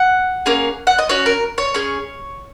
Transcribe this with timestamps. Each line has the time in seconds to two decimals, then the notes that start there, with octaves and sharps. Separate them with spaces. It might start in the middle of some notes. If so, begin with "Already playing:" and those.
Already playing: F#5
0.46 A#3 C#4 G#4
0.87 F#5
0.98 D#5
1.09 C#4 F#4 C#5
1.26 A#4
1.58 C#5
1.74 C#4 G#4